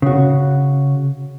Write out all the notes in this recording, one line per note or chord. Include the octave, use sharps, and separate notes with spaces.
C#3 F#4